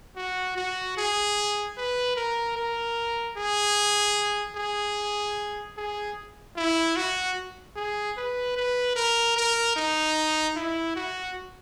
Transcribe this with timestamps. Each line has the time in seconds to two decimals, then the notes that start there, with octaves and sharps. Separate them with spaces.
0.16 F#4
0.56 F#4
0.97 G#4
1.77 B4
2.16 A#4
2.57 A#4
3.37 G#4
4.56 G#4
5.77 G#4
6.57 E4
6.96 F#4
7.76 G#4
8.17 B4
8.57 B4
8.96 A#4
9.36 A#4
9.76 D#4
10.56 E4
10.96 F#4